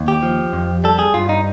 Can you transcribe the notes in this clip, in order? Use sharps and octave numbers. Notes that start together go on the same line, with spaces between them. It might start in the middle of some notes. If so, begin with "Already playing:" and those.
Already playing: D#2
G4
F3
F2
G3 A4
G#4
G2 F4
D#4